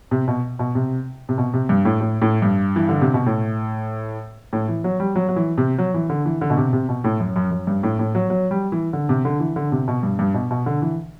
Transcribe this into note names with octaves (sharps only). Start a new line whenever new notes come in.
C3
B2
B2
C3
C3
B2
C3
G2
A2
A2
A2
G2
E3
D3
C3
B2
A2
A2
E3
F#3
G3
F#3
F#3
E3
C3
F#3
E3
D3
E3
D3
B2
C3
C3
B2
A2
F#2
F#2
F#2
G2
A2
A2
F#3
F#3
G3
E3
D3
C3
D3
E3
D3
C3
B2
G2
G2
B2
B2
D3
E3